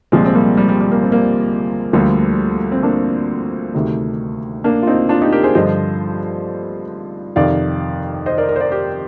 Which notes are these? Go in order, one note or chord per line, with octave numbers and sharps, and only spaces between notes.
C2 A#2 F3 G#3 C4
C4
G3 A#3
G3
G3
G3
A#3
C4
G3 A#3
D2 D3 F3 G3 A#3
C4
A#3 D4
D2 C3 D#3
A#3 D4
F4
C4 D#4
D4 F4
D#4 G4
G4 A#4
G#4 C5
G2 D3 F3 C5 D#5
F2 C3 D#3 D5 F5
C5 D#5
A#4 D5
A#4 D5
C5
A#4 D5
G4 A#4